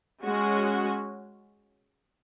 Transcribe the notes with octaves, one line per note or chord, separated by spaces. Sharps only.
G#3 C#4 F#4